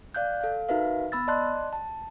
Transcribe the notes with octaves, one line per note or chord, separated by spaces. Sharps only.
D5 F5 F#6 G6
A4 F5
D#4 F#4 A#4 B4 E5 F5
B3 B5 E6 A6
D5 D#5 A5 C6 F#6
A5